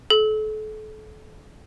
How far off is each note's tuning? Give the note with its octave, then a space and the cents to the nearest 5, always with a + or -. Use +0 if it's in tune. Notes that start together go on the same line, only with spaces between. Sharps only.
A4 -35